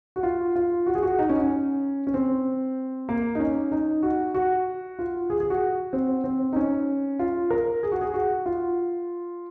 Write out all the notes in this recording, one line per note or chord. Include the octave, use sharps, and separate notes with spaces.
F#4
F4
F4
F#4
G#4
F#4
D#4
C#4
C#4
C#4
C4
A#3
D#4
C#4
D#4
F#4
F#4
F4
G#4
G#4
F#4
C4
C4
D#4
C#4
F4
A#4
G#4
F#4
G#4
F#4
F4